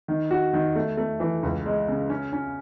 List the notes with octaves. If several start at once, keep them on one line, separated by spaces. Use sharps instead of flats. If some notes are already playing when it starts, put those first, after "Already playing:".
D#3
F#4
D#3
A3
A3
E3
C#2
G#3
C#3
C#4
C#4